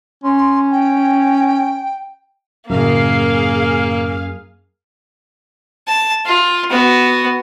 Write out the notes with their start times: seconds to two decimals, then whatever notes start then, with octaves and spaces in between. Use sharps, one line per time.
0.23 C#4 C6
0.71 G5
2.70 C#2 F#2 A2 C#3 A#3 G#4 F5
5.88 A5
6.26 F4
6.70 B3 F#4